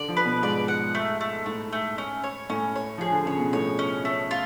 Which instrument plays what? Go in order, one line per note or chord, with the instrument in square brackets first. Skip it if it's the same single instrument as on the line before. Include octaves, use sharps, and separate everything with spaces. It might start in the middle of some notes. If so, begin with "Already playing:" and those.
Already playing: [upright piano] D3 [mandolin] D5
[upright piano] F3
[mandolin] B4
[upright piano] B2
[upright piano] G#2 [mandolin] D5
[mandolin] F#5
A3
A3
[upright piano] A2 [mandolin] A3
[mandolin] A3
C#4
C#5
[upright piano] A2 [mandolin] C#4
[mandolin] C#5
[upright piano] F3 [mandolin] G#4
[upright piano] D3
[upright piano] C#3 [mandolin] C#5
[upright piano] B2
[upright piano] A2 [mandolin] C#5
[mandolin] C#4
A3
F4